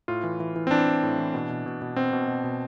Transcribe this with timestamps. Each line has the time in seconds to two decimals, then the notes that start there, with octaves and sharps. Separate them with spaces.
0.08 A2 F4
0.24 E3
0.40 E3
0.56 E3
0.67 C4
0.71 E3 D4
0.87 E3
1.03 A2
1.18 E3
1.34 B2
1.49 B2
1.66 B2
1.82 B2
1.96 B2 C4
2.13 B2
2.28 B2
2.44 B2